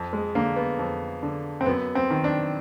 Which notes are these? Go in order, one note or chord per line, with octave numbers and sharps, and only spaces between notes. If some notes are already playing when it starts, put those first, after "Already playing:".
Already playing: F2
G#3
D3 A#3
B3
F2
D3
C4
F#2 B3
C4
D#3
D4